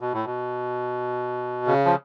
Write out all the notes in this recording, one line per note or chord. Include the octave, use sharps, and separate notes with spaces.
B2
A2
B2
C#3
F3